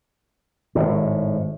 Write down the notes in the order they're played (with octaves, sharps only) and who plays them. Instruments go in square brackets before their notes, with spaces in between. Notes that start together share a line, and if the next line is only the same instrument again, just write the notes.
[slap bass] G#1 A2